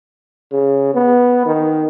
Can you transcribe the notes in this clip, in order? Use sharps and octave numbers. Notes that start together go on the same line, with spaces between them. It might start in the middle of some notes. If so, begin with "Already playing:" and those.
C#3
B3
D#3